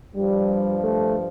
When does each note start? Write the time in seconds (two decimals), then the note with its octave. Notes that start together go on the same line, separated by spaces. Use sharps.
0.16 G2 F3 G3
0.84 A3